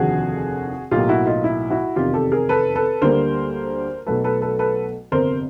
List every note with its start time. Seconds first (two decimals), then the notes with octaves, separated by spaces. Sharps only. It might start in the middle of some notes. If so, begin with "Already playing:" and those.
Already playing: F1 D#2 D3 F3 F#4 G#4
0.91 B1 A2 F#3 A#3 F4 G4
1.09 E4 F#4
1.27 D#4 F4
1.44 E4
1.70 E4 F#4
1.96 F1 E2 C3 D#3 F4 G4
2.14 G4 A4
2.32 G#4 A#4
2.49 A4 B4
2.76 A4 B4
3.02 D2 D3 G3 A#3 A#4 C5
4.07 B1 B2 F#3 A3 A4 B4
4.24 A4 B4
4.41 A4 B4
4.59 A4 B4
5.12 G1 F2 C3 A#4 C5